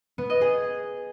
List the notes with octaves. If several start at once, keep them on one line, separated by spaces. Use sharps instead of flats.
B3
D#5
G#4